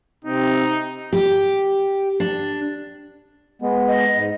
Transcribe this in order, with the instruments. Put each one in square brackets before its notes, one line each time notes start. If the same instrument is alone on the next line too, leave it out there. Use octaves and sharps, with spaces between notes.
[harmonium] C3 C4 [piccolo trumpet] D#4
[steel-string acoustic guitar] G4
D4
[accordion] G#3 B3
[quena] D#5
[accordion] G#2